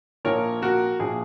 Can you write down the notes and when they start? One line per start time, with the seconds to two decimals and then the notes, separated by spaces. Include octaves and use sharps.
0.25 A#1 A#2 F3 A#4 C#5
0.62 F#4 A#4
0.99 A#1 A#2 F3 G#4